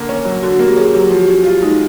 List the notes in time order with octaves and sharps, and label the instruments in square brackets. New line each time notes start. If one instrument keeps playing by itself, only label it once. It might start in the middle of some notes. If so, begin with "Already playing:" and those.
Already playing: [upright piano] D3 A#3
C#4
F#3
[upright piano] D3 [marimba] F#4
[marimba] F#4
[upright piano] A#3
[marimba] G4
[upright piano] C#4 [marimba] G#4
[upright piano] F#3 [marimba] G4
[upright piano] F3 [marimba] F#4
[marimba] G4
[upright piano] C#4 [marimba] F#4
[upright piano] F4 [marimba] G4
[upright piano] G#3 [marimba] D#4